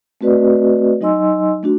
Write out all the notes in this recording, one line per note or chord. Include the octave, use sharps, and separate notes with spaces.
A3 C4 F#4 B4 D5 D#5
F#3 D#4 D#5 G#5 C6 E6
A3 D4 F#4